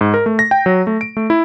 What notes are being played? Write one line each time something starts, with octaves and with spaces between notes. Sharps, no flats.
G#2
A#4
A3
A#6
G5
F#3
A3
D7
A3
E4